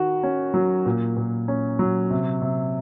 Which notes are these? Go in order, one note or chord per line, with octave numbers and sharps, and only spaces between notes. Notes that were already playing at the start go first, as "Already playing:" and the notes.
Already playing: D#3 F#4
C#4
F#3
A#2
A#2
C#4
F#3
C3
C3